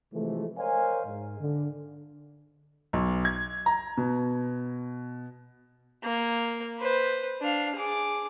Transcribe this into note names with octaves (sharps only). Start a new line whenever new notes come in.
C3 E3 F3 G#3 A3
A#4 C5 C#5 D#5 F5 G#5
G#2
D3
B1
G#6
A#5
B2
A#3
B4 C5
D4 F5
G#4 D6